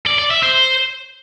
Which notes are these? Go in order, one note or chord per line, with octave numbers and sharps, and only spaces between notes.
D5
D5
E5
C5